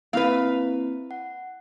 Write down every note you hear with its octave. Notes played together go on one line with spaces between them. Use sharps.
A#3 C4 E4 B4 F5
F#5